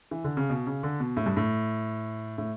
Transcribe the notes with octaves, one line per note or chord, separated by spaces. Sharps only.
E3
D3
C#3
B2
C#3
D3
B2
A2
G2
A2
A2